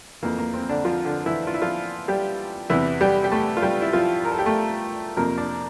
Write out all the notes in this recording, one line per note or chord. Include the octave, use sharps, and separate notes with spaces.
F2 E3 A#3
A#3
C4
D3 D4
F3 F4
D3 D4
E3 E4
F4
E4
F3 F4
G3 G4
E2 C3 E3 E4
G3 G4
G4
A3 A4
F4
G3 G4
E4
F3 F4
A#4
A4
G4
A3 A4
F2 C3 F3 A#3 A#4
D4 D5